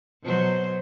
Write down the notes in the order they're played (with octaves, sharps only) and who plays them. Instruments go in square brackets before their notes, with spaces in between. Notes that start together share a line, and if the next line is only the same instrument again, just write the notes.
[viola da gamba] B2 F#3 C5